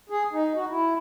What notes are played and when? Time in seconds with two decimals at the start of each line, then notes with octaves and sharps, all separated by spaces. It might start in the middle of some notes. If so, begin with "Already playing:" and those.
0.10 G#4
0.32 D#4
0.55 F#4
0.69 E4